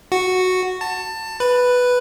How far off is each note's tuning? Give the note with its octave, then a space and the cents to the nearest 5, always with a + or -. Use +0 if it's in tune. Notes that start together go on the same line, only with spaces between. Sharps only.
F#4 -5
A5 +20
B4 +0